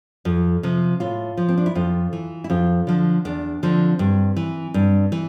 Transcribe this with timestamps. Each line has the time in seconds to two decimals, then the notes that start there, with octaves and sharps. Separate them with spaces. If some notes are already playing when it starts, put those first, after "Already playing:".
0.25 F2
0.63 C3 F3
1.00 A2 F4
1.37 F3
1.48 C4
1.58 D4
1.66 E4
1.75 F2 F4
2.13 E3
2.44 E4
2.50 F2 F4
2.87 D3 F3
3.25 E2 D4
3.63 D3 F3 C4
3.99 G2
4.36 E3
4.74 G2
5.12 E3